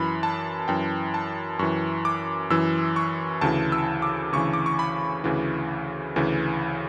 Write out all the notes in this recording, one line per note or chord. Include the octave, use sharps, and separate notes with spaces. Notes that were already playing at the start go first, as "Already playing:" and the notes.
Already playing: F#2 E3 B5
A5
F#2 E3 G5
A5
F#2 E3 C#6
D6
F#2 E3 E6
C#6
D2 C#3 E3 A5
E6
D6
D2 C#3 E3 C#6
D6
C#6
B5
D2 C#3 E3
D2 C#3 E3